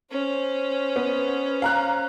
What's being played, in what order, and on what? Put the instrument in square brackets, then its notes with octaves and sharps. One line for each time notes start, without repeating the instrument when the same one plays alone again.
[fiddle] C#4 C5
[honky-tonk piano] B3
F5 A#5 F#6